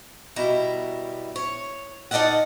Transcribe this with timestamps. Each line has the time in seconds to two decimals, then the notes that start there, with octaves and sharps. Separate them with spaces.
0.36 B2 G3 E4 A#5
1.36 C#5
2.11 D#4 A4 D5 D#5 F5 F#5